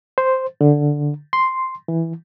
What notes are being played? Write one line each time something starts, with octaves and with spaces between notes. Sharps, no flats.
C5
D3
C6
E3